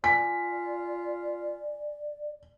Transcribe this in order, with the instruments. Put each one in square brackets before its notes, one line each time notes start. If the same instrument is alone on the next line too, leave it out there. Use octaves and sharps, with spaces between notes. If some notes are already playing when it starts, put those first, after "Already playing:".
[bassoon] F4 [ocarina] D5 [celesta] G#5 [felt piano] B6